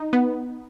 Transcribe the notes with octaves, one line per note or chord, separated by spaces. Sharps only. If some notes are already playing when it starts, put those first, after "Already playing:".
Already playing: D#4
B3